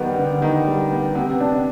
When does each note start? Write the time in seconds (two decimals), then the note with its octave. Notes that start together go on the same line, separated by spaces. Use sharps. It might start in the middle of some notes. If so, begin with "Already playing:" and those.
Already playing: D#3 G3 B3
0.18 D3
0.42 D#3 D#4
0.67 G3
0.91 B3
1.15 C3 B3
1.40 D4